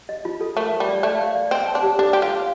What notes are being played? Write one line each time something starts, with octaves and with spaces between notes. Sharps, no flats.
D#5
F4
A4
A3 A#4
A#4
G3
D5
A3 D5
F5
D5
C4 D#5
A5
D4
G4
D4 A4
G4 C6
F4
F5